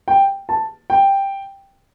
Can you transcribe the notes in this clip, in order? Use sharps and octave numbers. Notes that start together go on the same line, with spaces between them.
G5
A5
G5